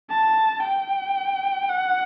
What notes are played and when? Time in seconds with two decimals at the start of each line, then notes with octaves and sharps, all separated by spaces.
0.10 A5
0.63 G5
1.69 F#5